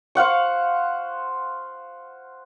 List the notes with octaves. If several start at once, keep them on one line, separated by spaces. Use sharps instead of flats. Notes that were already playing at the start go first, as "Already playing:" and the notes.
C5 F5 F#5 C#6